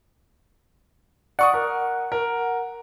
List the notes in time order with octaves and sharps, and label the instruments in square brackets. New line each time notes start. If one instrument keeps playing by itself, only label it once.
[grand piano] D5 C#6 D#6 [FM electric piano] F#5
[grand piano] A#4
A#4